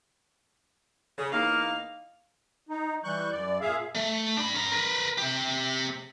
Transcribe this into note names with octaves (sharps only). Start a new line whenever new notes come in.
C#3
E2 A#3 D#4 F5
D#4
E3 G3 C#6 F#6 G6
F#2 D5
A#2 G#4 E5 F5
A3
D4 B5
C#4 A#5
A#4 B4
C3 G4